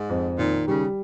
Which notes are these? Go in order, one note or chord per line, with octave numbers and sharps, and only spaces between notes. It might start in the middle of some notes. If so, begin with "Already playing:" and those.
Already playing: G#2
F2
A#2 D#3
C#3 G3